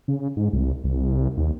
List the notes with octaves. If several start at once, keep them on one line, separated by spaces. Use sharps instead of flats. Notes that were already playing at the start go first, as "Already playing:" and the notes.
C#3
G#2
C2
C2
D#2